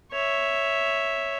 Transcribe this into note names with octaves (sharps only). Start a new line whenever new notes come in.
C#5 E5